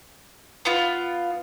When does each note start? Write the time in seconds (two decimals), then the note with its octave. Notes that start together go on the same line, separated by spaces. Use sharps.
0.65 B3 F4